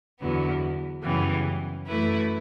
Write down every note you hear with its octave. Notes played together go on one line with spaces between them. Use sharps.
E2 D3 F#3 B3 E4
F#2 C#3 E3 G3 B3
F#2 E3 A3 E4 B4